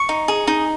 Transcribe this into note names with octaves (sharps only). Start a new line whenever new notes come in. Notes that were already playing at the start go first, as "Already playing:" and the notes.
Already playing: C#6
D#4
G#4
D#4